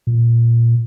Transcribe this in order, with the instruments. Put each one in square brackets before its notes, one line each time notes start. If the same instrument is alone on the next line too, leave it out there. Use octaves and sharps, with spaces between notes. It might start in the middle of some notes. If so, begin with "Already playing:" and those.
[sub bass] A#2